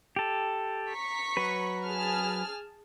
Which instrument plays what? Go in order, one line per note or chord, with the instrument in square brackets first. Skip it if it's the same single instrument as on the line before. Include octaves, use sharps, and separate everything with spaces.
[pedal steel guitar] G4 A4
[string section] A#5 C#6 B6
[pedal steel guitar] F#3 B4
[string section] G#4 A5 F6